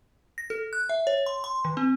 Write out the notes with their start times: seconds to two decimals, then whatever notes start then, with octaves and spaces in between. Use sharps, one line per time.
0.38 A#6
0.50 A4
0.73 F#6
0.89 E5
1.07 C#5
1.26 C6
1.44 C6
1.65 D#3
1.77 C4